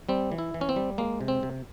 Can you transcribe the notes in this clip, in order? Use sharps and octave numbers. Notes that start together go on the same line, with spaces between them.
G3 C4
E3
E4
E3
C#4
C4
G3
G#3 A#3
C3
C4
C3